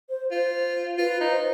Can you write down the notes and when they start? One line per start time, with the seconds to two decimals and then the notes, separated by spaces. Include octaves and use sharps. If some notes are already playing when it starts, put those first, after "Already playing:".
0.10 C5
0.31 F4 C5
0.98 F4 B4
1.20 D#4
1.31 C5